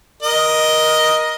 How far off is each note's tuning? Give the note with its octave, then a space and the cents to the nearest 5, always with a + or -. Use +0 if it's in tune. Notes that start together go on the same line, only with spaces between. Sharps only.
A#4 +20 D#5 +0